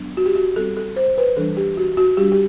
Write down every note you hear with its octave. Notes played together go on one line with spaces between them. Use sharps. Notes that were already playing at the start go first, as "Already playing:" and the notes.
Already playing: F#3 B3 D4
F#4
G4
F#4
G3 C4 A4
A4
C5
B4
E3 G3 D4 A4
G4
F#4
F#4
G3 D4 G4
G4